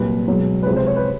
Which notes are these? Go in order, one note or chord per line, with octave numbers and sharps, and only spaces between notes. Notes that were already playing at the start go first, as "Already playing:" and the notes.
Already playing: C2 A#2 F#3 B4
C#2 B2 F#3
B4
C#2 C3 F3 C5
C5
C#5
B4